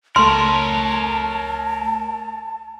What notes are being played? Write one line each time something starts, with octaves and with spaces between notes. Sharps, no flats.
C#2 A3 A#4 C#5 A5 C6